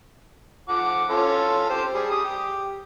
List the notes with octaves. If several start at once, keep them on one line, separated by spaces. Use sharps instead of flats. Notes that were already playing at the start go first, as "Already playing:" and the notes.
F3 F#5 D6
C#4 F4 A4
G4 C5
G3 G#4
G3 D#6
G4